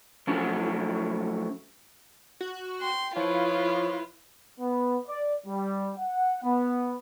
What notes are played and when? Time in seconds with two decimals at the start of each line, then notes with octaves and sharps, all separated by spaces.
0.27 F3 F#3 A3 C#4
2.41 F#4
2.81 G5 C6
3.16 F3 E4 F4 B4 C#5
4.59 B3
5.07 D5
5.46 G3
5.99 F#5
6.43 B3